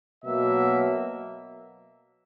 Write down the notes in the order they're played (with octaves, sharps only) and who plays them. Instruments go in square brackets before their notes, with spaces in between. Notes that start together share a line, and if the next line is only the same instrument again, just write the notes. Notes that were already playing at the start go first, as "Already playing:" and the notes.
[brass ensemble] B2 F#3 A#3 E5